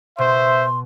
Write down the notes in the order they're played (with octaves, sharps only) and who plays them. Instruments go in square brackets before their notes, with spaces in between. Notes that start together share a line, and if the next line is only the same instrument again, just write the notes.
[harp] B2 [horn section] C5 [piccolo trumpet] E5 [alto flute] C6